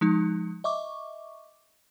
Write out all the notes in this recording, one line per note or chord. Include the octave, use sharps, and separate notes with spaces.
F3 G#3 D#4
D#5 E5 C#6 D6